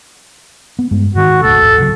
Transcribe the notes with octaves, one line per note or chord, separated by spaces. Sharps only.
B3
G2 G#3
G#2 D#3 F#4
E1 A1 D2 A4
C2 C#3 F#3